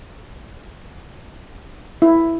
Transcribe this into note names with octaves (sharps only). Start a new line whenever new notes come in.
E4